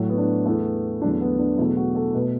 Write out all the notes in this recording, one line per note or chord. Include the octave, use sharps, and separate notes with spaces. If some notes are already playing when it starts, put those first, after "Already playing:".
Already playing: A2 F#3 A3
B3
D4
E2 E3 A3 B3
E2 D3 F#3 A3 D4
B3
D4
E2 B2 F#3 A3 E4
F#4
A4
B2 A3 B4